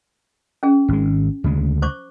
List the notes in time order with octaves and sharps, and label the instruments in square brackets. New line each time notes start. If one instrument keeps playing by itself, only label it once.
[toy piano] C#4 G#4
[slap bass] G#1 G#3
D2 C#3 G#3
[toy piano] C5 C#6 D6